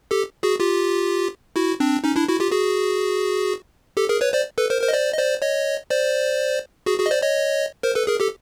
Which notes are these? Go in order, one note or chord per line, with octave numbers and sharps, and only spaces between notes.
G4 A4
F#4 G#4
F4 G4
E4 F#4
C4 D4
C#4 D#4
D4 E4
E4 F#4
F4 G4
F#4 G#4
G4 A4
G#4 A#4
B4 C#5
C5 D5
A4 B4
A#4 C5
A#4 C5
D#5
C5 D5
D#5
C5 D5
C#5 D#5
C5 D5
F#4 G#4
F#4 G#4
D#5
C5 D5
C#5 D#5
A#4 C5
A4 B4
G#4 A#4
G4 A4